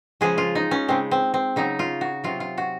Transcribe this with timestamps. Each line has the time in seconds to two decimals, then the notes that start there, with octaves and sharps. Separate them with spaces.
0.21 C#3 F3 G#3 G#4
0.38 F4
0.55 D#4
0.71 C#4
0.88 C#3 G#3 C4
1.11 C4
1.34 C4
1.56 C#3 F#3 D#4
1.79 F4
2.01 F#4
2.24 C3 F#3 F4
2.40 F4
2.58 F#4